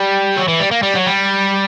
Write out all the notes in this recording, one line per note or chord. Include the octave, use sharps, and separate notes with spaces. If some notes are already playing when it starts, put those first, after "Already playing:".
Already playing: G3
F#3
E3
G3
A#3
G3
F#3
G3